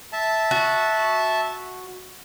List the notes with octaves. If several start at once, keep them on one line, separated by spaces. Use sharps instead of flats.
E5 A5
F#4